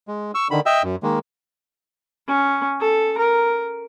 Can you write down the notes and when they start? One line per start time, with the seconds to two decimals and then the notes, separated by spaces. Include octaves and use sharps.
0.08 G#3
0.35 C#6 E6
0.51 D3 D#3 B5
0.66 D#5 E5 G5 E6
0.83 F#2
1.03 D#3 G#3 A#3
2.27 C#4
2.80 A4
3.17 A#4